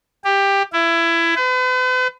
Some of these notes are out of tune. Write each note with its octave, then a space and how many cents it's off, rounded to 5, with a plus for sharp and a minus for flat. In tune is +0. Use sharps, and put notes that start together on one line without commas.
G4 +15
E4 +20
B4 +45